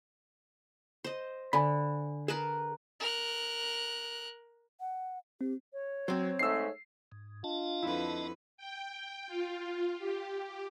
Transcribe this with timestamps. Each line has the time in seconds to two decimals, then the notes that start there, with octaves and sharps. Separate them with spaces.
1.04 C5 D#5
1.53 D3 G#5 B5
2.28 G#4 A#4 B4 A5
3.00 A#4 F#6
4.80 F#5
5.41 C4 G4
5.73 C#5
6.08 F#3 C4 C5
6.39 G#2 A3 E6 C7
7.12 G#2
7.44 D4 F4 D#5 A5
7.82 F2 D3 E4 B4
8.57 G5
9.27 F4
9.98 G4